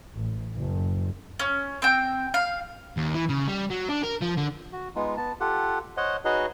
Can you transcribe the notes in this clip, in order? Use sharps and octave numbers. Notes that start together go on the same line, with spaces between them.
A1
F#1
C#4
C4 G5
F5
D#2
E3
C#3
G3
F#3
D4
A#4
F3
D3
F#4
G#3 B3 D#4 F4
B3 A5
F4 G4 A4 F#5
C5 C#5 D#5 F#5
D#4 F#4 G#4 B4 C#5 D#5